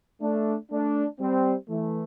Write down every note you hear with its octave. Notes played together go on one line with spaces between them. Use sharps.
A3 D4
A3 D4
G3 C4
E3 A3